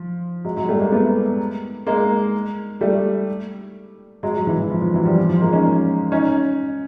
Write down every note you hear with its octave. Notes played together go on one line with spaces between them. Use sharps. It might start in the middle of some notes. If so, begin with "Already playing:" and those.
Already playing: F3
F#3 G#3
F#3 G#3
G3 A3
G#3 A#3
A3 B3
G#3 A#3
G3 A3
F#3 G#3
F#3 G#3
E3
E3
F3
F3
E3 F#3
F3 G3
F3
F3
G#3 A#3
C#4 D#4
C#4 D#4